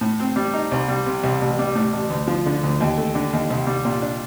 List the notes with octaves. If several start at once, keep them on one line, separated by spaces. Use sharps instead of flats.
A2
C4
G3
D#4
C2
G3
C3
C2
A1
G3
A2
A1
D2
F3
D3
D2
D#2
A3
D3
D#2
C2
G3
A#2
D4